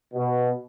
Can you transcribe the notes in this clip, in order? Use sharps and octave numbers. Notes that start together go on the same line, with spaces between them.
B2